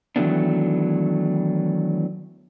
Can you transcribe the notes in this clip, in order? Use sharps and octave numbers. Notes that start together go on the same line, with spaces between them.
D#3 E3 F#3 A3 B3 D4